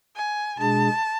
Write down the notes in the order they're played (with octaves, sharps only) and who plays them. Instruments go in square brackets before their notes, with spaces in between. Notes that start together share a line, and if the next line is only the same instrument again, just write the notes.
[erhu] G#5
[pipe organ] B2 G#3 D4 G#4 [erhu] A5